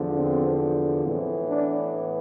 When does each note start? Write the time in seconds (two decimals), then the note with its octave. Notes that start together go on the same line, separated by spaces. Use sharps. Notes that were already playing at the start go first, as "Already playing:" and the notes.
Already playing: E2 D3 F3
0.16 C4
1.04 A2 E3 B3 C4
1.49 D4